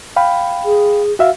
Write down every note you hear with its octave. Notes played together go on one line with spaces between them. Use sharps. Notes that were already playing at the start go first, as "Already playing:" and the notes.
F5 G5 B5
G#4
F#4 E5 F5